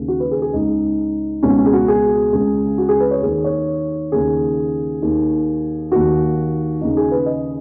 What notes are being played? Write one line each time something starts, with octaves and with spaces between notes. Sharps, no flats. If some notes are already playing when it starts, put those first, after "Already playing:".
Already playing: D#2 C#3
F#4
B4
G#4
G#4
C#2 C#3 D#4
C#2 B2 C#4
C#4
G#4
F#4
G#4
C#2 C#3
F#4
G#4
B4
C#5
D#2 D#3 G#4
C#5
D#2 C#3 G#4
D#2 D#3
D#2 D#3 F#4
D#2 C#3 D#4
G#4
B4
D#5